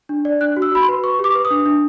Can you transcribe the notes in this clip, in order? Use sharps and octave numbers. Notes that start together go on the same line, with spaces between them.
D4
D5
D4 F#6
F#4
E6
F#4 B5
C6
B4
B4 C#6
G4 D6
B4
D#6
D4
D4